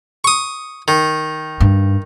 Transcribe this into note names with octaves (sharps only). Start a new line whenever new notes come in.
C#6 D#6
D#3
G2